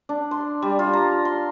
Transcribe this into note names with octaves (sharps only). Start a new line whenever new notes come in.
D4
C6
G3
F4
A#5
C6